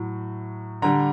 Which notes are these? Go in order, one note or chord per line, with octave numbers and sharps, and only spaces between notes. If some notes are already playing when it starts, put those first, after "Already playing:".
Already playing: A2 F#3
D3 G3 A#5